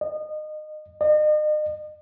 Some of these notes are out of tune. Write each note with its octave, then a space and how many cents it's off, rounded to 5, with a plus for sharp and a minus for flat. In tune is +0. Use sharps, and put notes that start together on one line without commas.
D#5 -25
D#5 -40